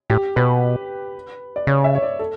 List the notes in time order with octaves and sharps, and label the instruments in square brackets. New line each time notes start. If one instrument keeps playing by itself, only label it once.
[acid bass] A2 [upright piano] G4
[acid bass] B2 [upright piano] B4
[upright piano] D5
[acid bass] C#3 [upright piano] C#5
[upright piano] E5
C#5
D5
A4